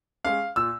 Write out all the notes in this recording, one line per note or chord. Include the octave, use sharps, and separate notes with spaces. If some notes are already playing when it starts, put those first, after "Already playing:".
G#3 C#4 F5
A#2 E6